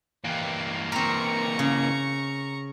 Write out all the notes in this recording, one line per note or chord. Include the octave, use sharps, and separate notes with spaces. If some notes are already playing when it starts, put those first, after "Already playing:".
E3 A#3 G4 F5
C4 A#4 A#5 C#6
C#3